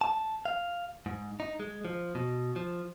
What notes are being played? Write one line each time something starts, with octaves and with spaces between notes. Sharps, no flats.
A5
F5
G#2
D#4
G#3
F3
B2
F3